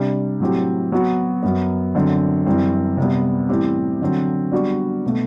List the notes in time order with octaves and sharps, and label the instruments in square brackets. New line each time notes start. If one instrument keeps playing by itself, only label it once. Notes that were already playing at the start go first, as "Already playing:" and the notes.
Already playing: [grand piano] C3 G3 D4 G4
A2 F#3 C4 G4
F#3 B3 F#4
F#2 F#3 B3
F#2 D3 F#3 C4
F#2 E3 G3 C4
C3 G3 B3
A2 E3 G3 C4 G4
D3 F#3 C4
G3 B3 D4 F#4
B2 A3